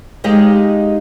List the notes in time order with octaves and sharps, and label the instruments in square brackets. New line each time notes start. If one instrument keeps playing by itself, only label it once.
[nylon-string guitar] G#3 D#4 G4 D#5 F5